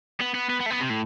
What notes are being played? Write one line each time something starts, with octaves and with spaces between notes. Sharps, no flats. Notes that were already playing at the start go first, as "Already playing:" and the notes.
B3
B3
B3
B3
A3
B3
C3
A2